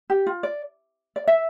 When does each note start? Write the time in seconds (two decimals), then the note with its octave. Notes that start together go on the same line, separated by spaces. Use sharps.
0.10 G4
0.27 F4
0.43 D5
1.16 D5
1.27 E5